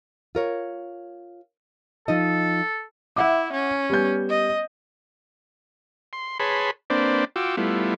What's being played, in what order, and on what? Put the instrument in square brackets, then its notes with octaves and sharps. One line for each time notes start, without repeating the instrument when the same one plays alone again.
[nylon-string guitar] F4 A#4 C#5
[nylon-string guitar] F3 D#4 D#5 [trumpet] A4
[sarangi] E4 [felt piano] E5 F#5 D6
[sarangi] C#4
[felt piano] G3 B3 G6
[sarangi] D#5
[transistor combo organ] C6
G#4 B4 C#5 A5 B5 C6
A#3 C4 D4 B4 C5 D5
F4 F#4 G5 D6 E6
G3 A3 B3 E4 F4